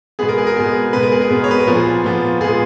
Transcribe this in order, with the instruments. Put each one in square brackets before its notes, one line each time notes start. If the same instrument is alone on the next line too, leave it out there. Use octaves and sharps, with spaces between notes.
[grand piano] B2 G#3 B3 G#4
A#4
G#4
A#4
B2 G#3 B3 G#4
B2 G#3 B3 B4
A#4
G#4
A#4
B2 G#3 B3
C#5
B4
A#4
A#2 F3 B3 G#4
A#2 F3 B3
A#2 G#3 B3 G#4